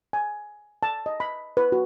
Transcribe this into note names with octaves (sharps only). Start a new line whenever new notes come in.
G#5
A5
D#5
B5
B4
F#4